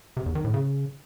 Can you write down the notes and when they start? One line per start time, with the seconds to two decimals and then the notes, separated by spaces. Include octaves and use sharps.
0.17 C3
0.26 E2
0.35 D#3
0.44 A2
0.54 C#3